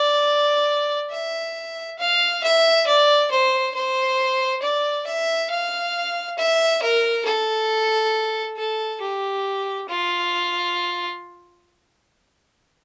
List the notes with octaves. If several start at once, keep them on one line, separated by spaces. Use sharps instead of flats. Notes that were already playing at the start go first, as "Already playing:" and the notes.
Already playing: D5
E5
F5
E5
D5
C5
C5
D5
E5
F5
E5
A#4
A4
A4
G4
F4